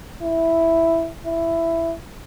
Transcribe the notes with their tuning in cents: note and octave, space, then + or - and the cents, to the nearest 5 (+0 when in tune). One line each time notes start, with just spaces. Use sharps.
E4 +0
E4 +10